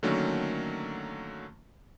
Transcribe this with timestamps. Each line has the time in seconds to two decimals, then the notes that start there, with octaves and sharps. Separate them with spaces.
0.03 D3 D#3 F#3 A3 A#3 C#4